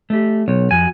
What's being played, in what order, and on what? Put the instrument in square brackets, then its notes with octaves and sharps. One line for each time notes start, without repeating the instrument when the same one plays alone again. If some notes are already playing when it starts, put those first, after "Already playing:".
[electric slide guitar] A3 G4
[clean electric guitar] B1 [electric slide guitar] C#5
[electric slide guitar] F2 F#4 [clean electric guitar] G#5